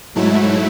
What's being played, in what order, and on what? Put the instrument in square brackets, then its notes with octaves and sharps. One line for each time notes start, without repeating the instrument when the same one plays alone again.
[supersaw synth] G#2 F#3 A3 E4 [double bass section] G#3